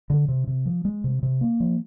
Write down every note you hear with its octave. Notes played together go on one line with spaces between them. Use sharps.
D3
C3
C3
F3
G#3
C3
C3
A#3
F3